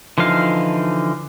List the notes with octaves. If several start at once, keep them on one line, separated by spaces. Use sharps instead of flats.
D3 E3 F3 D#4 F5